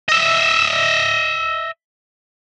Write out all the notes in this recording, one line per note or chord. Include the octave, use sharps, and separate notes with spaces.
D#5 E5